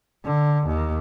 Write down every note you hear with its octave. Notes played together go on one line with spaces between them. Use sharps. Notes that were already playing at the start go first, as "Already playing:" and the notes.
D3
D#2